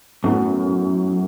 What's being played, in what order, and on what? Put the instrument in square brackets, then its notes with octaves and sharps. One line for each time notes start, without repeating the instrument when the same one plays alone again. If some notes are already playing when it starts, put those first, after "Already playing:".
[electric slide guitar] F#2 [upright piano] A2 F#3 B3